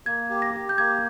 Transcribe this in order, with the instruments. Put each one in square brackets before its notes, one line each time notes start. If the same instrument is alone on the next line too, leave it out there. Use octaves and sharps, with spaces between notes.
[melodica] A#3 [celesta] G#6
[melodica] G4
[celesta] A#6
[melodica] G4
[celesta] G6
[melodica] A#3 [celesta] G#6